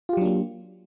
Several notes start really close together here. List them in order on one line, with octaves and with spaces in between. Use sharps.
F4 G4 F#3 D4 A#3